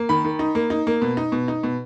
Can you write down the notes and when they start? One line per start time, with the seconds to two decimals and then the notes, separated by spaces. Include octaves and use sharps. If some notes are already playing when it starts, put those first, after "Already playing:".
Already playing: A#3
0.09 D#3 B5
0.25 D#3
0.39 D#4
0.55 A#3
0.70 D#4
0.87 A#3
1.02 B2
1.17 D#4
1.32 B2
1.48 D#4
1.63 B2